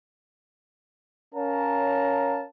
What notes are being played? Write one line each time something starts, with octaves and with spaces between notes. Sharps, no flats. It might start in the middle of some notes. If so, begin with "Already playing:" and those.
C#4 A#4 C#5 F5 A5 A#5